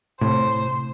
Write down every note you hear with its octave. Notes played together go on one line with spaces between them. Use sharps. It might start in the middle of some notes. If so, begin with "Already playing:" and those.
A2 C3 C5